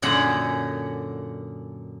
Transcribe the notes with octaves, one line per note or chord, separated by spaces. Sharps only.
F#2 A#2 D3 G#4 F#5 A#5